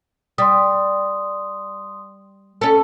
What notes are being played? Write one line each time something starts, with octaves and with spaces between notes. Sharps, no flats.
G3 C6 D#6
C#4 A4